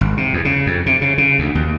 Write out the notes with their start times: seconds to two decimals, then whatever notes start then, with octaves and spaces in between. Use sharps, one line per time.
0.01 G#1
0.17 C3
0.33 E2
0.45 C#3
0.67 F2
0.86 C3
1.01 C#3
1.18 C#3
1.39 D2
1.55 D#2